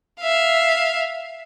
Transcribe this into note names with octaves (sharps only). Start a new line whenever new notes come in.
E5 F5